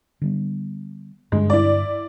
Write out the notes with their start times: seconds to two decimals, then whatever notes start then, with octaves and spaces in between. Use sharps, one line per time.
0.21 D3 G3 B3
1.32 G2 D3 G#3 D4
1.50 E4 D5